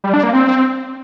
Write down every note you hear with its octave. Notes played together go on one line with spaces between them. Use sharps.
G3
D4
A#3
C4